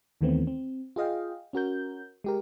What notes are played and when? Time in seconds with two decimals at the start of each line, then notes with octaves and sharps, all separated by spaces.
0.21 D#2 D#3 E3 A3 B3 C4
0.47 C4
0.96 F4 G#4 D#5 F5 G5
1.53 C#4 F#4 A#4 G6
2.24 G#3 G4 A#4